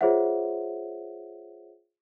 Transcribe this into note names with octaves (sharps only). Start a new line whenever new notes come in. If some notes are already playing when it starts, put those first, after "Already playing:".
F4 G#4 C5 C#5 E5 F#5